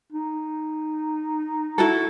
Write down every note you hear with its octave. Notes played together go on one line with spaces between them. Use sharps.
D#4
E4 F#4 A4